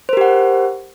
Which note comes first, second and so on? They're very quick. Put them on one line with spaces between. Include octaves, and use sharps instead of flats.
C5 A#4 G4 F#5